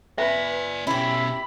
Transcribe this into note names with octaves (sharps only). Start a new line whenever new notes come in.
B4 D5 E5 G#5
B2 C#4 E4 G4 B5